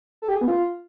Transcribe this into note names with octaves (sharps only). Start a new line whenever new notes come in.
A4
G4
G#4
B3
F4